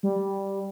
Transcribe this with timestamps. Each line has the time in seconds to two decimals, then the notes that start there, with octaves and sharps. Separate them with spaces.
0.03 G3